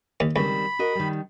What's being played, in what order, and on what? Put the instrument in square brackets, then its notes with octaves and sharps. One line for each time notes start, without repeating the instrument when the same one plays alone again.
[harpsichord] D#2
[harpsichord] C#2 [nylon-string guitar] D#3 G3 C4 [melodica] B5
[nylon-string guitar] F#4 A#4 D#5
D#3 G3